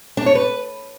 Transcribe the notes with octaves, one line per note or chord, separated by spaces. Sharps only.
D4
C#5
B4